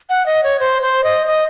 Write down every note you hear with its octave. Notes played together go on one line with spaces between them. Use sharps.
F#5
D#5
C#5
C5
C5
D#5
D#5